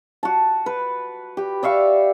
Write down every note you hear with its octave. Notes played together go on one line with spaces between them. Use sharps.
F#4 A5
B4
G4
D5 E5 F5 C#6